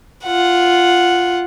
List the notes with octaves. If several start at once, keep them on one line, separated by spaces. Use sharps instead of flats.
F4 F#5